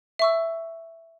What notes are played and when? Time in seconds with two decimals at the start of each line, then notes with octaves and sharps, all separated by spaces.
0.19 E5 C#6 E6